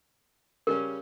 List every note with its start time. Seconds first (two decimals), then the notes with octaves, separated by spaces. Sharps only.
0.67 C#3 G3 C#4 A#4